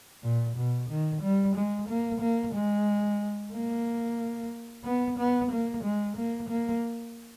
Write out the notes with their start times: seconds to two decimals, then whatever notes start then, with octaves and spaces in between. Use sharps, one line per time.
0.22 A#2
0.56 B2
0.89 D#3
1.22 G3
1.56 G#3
1.88 A#3
2.21 A#3
2.54 G#3
3.53 A#3
4.84 B3
5.18 B3
5.51 A#3
5.83 G#3
6.17 A#3
6.49 A#3